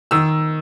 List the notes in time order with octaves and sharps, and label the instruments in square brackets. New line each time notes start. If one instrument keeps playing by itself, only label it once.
[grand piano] D#3 E6